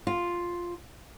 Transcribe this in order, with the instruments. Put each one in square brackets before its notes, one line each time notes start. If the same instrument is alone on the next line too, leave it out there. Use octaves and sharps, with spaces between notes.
[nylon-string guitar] F4